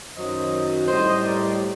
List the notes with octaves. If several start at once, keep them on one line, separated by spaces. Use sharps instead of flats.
F#2 D#3 F#3 C5 D#5
A2 G3 C5 D#5
A#4 D5